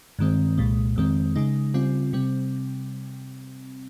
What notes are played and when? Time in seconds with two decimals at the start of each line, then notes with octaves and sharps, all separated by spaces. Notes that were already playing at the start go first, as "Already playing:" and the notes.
0.19 G2 D#3 G#3 C4
0.58 C2 A#2 G#3
0.96 F2 D#3 G#3 C4
1.36 C#3 G#3 D#4
1.74 C#3 G3 C4 F4
2.13 C3 G3 C4